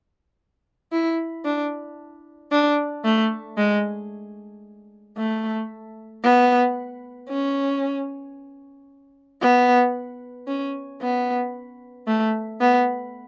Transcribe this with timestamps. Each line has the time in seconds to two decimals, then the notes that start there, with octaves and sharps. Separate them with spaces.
0.92 E4
1.45 D4
2.52 D4
3.05 A3
3.58 G#3
5.17 A3
6.24 B3
7.29 C#4
9.41 B3
10.48 C#4
11.02 B3
12.07 A3
12.61 B3